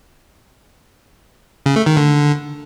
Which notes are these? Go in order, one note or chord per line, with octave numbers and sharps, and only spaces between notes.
C#3
A3
D#3
D3